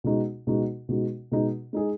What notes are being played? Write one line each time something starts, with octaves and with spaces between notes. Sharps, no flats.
B2 G#3 D#4 F#4
B2 G#3 D#4 F#4
B2 G#3 D#4 F#4
B2 G#3 D#4 F#4
G#3 D#4 G#4